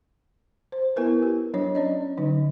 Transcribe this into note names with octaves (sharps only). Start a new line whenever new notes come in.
C5
B3 E4 A#4 B4
G4
F#3 D4 C#5
C#4 D5 D#5
D3 F#3 D#4